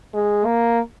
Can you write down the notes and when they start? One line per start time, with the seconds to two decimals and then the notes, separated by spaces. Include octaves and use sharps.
0.14 G#3
0.45 A#3